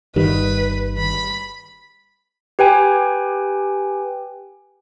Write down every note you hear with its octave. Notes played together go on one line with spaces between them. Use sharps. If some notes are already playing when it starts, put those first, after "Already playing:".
G1 D#3 G3 B4
B5
G4 B4 G5 G#5